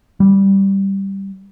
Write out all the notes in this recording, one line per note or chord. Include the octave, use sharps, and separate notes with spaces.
G3